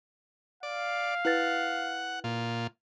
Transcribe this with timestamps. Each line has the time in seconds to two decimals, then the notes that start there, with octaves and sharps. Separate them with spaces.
0.63 D5 F5
1.25 E4 B4 F#5 A6
2.24 A#2 F4